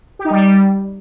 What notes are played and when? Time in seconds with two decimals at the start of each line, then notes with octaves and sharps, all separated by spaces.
0.19 G4
0.25 D#4
0.30 G3